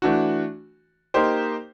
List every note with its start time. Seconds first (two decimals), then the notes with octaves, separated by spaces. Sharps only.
0.02 E3 A3 D4 F#4
1.14 A#3 D#4 G4 C5